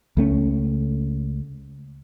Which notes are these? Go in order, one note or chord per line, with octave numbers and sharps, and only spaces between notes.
C#2 A3 C#4